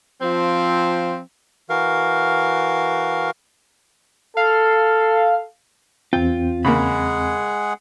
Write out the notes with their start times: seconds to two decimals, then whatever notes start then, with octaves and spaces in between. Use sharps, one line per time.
0.22 F3 C4
1.70 E3 F#4 A#4 F5
4.37 A4 F5
6.13 E2 C4 F4 G5
6.65 C#3 G#3 A#3 G#4 F#5 B5